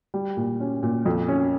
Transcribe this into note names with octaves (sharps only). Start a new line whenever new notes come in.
G3
A#2
C#4
A#2
F2
C#4